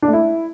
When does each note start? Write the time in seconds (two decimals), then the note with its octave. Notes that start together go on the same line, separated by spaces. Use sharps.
0.02 D4
0.08 A3
0.13 E4